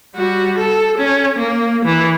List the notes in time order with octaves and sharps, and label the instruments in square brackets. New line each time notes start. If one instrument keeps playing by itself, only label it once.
[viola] G3 F#4
A4
C#4
A#3
E3